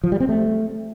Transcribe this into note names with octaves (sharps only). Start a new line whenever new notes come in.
F3
G3
C4
A3